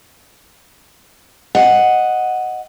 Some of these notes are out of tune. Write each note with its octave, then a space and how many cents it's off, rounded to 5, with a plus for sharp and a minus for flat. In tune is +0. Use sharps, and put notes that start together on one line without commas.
D#5 +0 F#5 +0